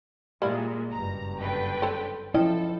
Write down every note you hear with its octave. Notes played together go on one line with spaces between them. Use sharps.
A#2 G3 G#3 A#3 E4
F#1 G2 A#5
D3 B4 G5
C4 A4 C#5
F3 C#4 E4 A4 D#5 G5